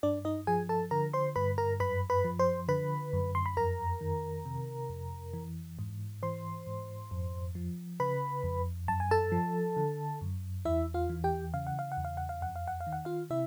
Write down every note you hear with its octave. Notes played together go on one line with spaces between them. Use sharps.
G2 D4 D5
D#4 D#5
F3 G#4 G#5
A4 A5
D3 A#4 A#5
C5 C6
G2 B4 B5
A#4 A#5
F#2 B4 B5
B4 B5
F3
C5 C6
D3 B4 B5
F#2
C6
B5
F2 A#4 A#5
D#3
C3
F2
E3
G#2
E3 C5 C6
G#2
F2
F3
C#3 B4 B5
F2
F#2 A5
G#5
A4 A5
F3
D3
F#2
E2 E4 E5
F4 F5
E3
G4 G5
C#3 F5
F#5
F5
F#5
E2
F5
F#5
F5
F2 F#5
F5
F#5
F5
D#3
F#5
F4 F5
C3 E4 E5